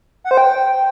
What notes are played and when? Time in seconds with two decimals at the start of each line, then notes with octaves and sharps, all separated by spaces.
0.24 F#5
0.31 C5
0.37 G5